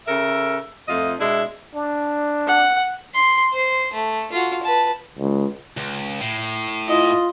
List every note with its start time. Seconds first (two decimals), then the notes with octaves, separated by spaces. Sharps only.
0.06 C#3 A4 A#4 E5
0.88 F2 A3 F4 D#5 E5
1.20 B2 G#3 D4 E4
1.75 D4
2.47 F#5
3.14 C6
3.53 C5
3.93 A3
4.32 F4 F#4
4.63 B4 A5
5.19 C#2
5.77 C#2
6.21 A2 C7
6.89 E4 F4 D#5